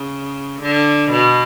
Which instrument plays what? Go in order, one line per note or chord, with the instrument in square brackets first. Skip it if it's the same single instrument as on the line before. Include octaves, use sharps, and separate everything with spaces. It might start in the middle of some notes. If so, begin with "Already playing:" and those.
Already playing: [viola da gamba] C#3
D3
B2